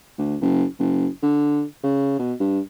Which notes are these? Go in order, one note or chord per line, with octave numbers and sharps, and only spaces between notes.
D2
F#1
F#1
D3
C#3
B2
G2